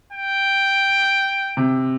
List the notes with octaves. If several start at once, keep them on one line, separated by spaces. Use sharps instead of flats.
G5
C3